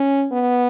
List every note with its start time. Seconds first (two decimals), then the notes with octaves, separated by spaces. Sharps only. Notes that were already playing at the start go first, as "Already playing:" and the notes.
Already playing: C#4
0.31 B3